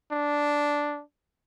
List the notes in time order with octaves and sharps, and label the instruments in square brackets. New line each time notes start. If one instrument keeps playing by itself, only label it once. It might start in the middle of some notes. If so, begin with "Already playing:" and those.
[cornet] D4